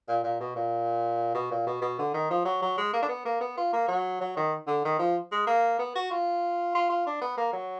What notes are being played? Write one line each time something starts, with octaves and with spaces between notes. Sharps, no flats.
A#2
A#2
B2
A#2
B2
A#2
B2
B2
D3
D#3
F3
F#3
F#3
G#3
A#3
D4
B3
A#3
B3
F4
A#3
F#3
F#3
D#3
D3
D#3
F3
G#3
A#3
B3
F#4
F4
F4
F4
D4
B3
A#3
F#3